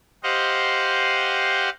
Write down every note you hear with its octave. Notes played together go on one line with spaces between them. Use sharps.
G4 C5 D#5 F5 F#5